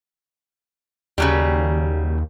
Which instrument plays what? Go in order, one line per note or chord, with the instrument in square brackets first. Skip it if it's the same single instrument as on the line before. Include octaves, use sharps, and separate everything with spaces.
[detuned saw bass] D#2 [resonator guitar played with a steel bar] C#3 F#3 G3